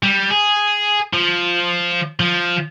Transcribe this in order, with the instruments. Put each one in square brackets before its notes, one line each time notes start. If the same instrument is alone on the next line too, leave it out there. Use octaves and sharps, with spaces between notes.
[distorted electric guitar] G3
G#4
F3
F3